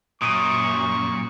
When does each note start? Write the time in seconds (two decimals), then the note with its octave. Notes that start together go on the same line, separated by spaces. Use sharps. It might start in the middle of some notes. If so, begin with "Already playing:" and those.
0.22 F#2 A#2 C#6 D#6 D7 D#7